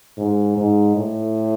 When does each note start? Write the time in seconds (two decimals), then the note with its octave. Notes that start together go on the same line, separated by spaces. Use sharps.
0.18 G#2
0.57 G#2
0.96 A2